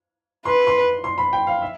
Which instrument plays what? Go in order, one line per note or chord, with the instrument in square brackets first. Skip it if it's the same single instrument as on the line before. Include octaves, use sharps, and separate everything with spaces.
[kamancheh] B4 [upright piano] C6
[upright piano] C6
C6
B5
G5
F5
E5